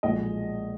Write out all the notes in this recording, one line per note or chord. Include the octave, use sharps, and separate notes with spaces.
B1 A#2 F3 G#3 D#5